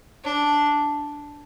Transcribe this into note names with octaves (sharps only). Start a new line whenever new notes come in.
D4